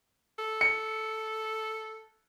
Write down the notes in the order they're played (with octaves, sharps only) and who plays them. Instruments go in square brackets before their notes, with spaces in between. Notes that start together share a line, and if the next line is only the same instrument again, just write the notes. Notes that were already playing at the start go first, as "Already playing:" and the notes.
[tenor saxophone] A4
[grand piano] C#7